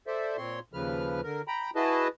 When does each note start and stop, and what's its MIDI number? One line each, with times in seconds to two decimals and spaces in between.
0.07 0.37 69
0.07 0.37 72
0.07 0.37 74
0.07 0.37 76
0.37 0.59 46
0.37 0.59 60
0.37 0.59 73
0.37 0.59 84
0.73 1.21 39
0.73 1.21 49
0.73 1.21 53
0.73 1.21 71
0.73 1.21 89
1.23 1.42 50
1.23 1.42 70
1.48 1.70 79
1.48 1.70 82
1.48 1.70 83
1.75 2.08 64
1.75 2.08 66
1.75 2.08 68
1.75 2.08 71
1.75 2.08 75
1.75 2.08 81